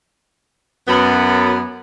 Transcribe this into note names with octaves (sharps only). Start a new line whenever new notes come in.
F#2 B3